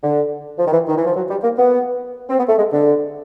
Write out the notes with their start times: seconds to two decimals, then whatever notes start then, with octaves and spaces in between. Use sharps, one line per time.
0.02 D3
0.59 F3
0.67 D#3
0.73 E3
0.88 D#3
0.97 E3
1.06 F3
1.16 F#3
1.30 G3
1.44 A#3
1.58 B3
2.29 C4
2.38 B3
2.49 A3
2.58 G#3
2.72 D3